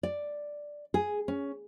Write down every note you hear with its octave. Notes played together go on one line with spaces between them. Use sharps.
D5
G#4
C#4